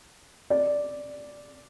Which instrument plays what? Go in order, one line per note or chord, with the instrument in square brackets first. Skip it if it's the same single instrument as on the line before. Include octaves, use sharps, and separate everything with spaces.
[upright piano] D5